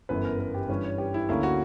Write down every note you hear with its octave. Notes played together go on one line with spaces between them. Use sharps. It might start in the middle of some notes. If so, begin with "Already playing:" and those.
G1 F#2 E3 B3 B4
A#4
A#4
G4
G2 E3 G3 C#4 B4
C#5
G4
E4
D2 D3 A#3 C#4 E4
F#4